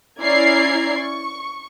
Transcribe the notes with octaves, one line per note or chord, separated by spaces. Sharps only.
C#4 E4 D5 A#5 G#6 C7
C#6